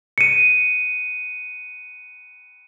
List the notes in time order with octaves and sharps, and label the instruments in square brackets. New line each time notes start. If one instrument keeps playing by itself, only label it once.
[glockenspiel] C#7 D#7